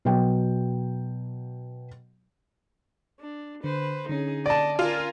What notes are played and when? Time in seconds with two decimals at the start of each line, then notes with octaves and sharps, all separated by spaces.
0.05 B2 F#3 G5
3.20 D4
3.64 D3 B4 C5
4.09 D3 C#4 D#4 G#4
4.46 D5 D#5 A5
4.79 F4 A#4 G#5